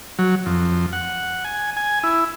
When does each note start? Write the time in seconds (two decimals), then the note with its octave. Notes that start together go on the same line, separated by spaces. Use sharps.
0.19 F#3
0.46 F2
0.93 F#5
1.45 G#5
1.77 G#5
2.04 E4